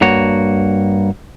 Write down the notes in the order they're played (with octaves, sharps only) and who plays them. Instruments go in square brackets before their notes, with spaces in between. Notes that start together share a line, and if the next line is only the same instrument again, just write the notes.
[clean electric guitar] G2 A#3 F#4 C#5